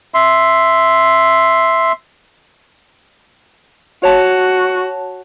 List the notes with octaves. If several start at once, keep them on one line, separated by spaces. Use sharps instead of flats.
E5 C6
F#4 C#5 A5